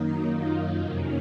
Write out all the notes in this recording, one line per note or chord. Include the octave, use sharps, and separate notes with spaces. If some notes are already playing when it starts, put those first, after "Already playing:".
Already playing: F#2 D#3 F#3 A#3 D#4
F4
F2 C3 D#3 F#3 A#3 C#4